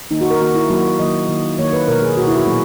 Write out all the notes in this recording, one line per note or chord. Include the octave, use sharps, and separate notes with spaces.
D#3 A#3 D#4
F#4
A#4
D#3 A#3 F#4
E4
D#3 F#3 A#3 F#4
D#3 F#3 A#3 D#5
D#3 A#3
D#3 A#3 C#5
B4
B2 A#3 A#4
G#4
B2 A#3 F#4
E4
F#4
A#2 F#3 B3 G#4